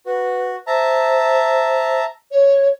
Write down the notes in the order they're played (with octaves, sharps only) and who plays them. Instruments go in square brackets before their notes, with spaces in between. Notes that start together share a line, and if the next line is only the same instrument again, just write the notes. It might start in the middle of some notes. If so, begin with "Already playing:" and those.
[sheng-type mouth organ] F#4 [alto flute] B4
[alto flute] C5 [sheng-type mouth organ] E5 A5 A#5
[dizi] C#5